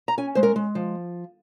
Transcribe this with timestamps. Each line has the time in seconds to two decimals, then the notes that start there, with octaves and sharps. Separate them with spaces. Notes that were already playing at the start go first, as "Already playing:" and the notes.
0.08 A#5
0.18 C#4 G#5
0.35 G#3 C5
0.43 A#4
0.56 G#3
0.75 F3